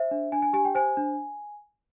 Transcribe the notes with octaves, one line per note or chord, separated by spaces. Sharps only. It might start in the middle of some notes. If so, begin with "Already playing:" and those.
Already playing: C5 E5
D4
D4 G#5
G#5
G4 G#5
G5
C5 G#5
D4